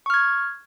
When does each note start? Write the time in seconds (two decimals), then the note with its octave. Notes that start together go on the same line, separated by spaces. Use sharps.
0.06 C#6
0.10 F6
0.14 G#6